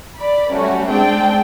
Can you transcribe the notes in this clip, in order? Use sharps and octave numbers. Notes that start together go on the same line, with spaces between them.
D5 B5
F#3 G3 A3 C#4 F#4
G#3 C4 D4 G#4 G5 A5